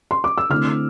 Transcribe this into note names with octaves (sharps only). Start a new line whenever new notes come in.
C6
D6
E6
D3 A3 C4 E4 F6